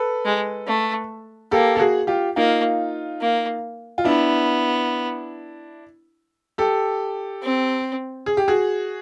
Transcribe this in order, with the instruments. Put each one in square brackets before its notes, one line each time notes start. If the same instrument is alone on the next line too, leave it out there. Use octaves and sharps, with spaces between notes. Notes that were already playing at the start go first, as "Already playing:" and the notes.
Already playing: [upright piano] A4 B4
[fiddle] G#3
A3
[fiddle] A#3 [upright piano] G4 A4
[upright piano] A4
F#4 G#4
F4 G4
[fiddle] A#3 [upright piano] D#4 F4
[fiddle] A#3
[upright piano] F4
[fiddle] B3 [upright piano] D4 E4
[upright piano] G4 A4
[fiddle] C4
[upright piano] G#4
G4
F#4 G#4